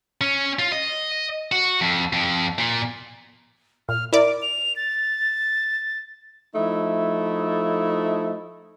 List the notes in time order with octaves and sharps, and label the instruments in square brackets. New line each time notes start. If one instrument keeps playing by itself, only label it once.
[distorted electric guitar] C#4
F4
D#5
F#4
F2
F2
A#2
[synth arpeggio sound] A#2 [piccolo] F6
[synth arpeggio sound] E4 A#4 D5 [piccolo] D6
[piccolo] F7
A6
[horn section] F3 A3 D#4 E4